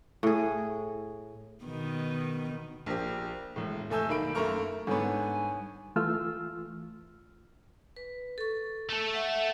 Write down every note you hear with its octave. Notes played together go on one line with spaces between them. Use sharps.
A2 G#4
B2 D#3 B3
A#1 F3 A#3 G4
E1 A2
F1 A3 A4 G#5 E6 G6
B1 D#3 A#3 B5 D7
F#2 A3 A#3 A#5 C#6 F6
G#2 D3 G3 B3 C#5 G#5 C#6
E3 A3 F4 E6 F6
B4
A4 C#6
A3 A4
E5 F#5